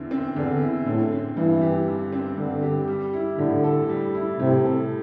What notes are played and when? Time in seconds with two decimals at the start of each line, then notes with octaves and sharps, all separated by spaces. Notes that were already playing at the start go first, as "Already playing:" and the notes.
Already playing: E2 D3 C4 E4
0.11 C4
0.36 E2 D3
0.62 E4
0.86 A2 D3
1.12 C4
1.37 G2 E3
1.61 G4
1.87 D3
2.12 C4
2.37 G2 D3
2.62 G4
2.88 G3
3.13 E4
3.38 A2 D3
3.64 A4
3.89 G3
4.15 E4
4.39 A2 C3
4.65 A4